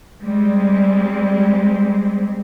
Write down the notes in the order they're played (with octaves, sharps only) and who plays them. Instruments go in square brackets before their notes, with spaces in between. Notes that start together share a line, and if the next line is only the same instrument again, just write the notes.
[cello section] G3 G#3 C4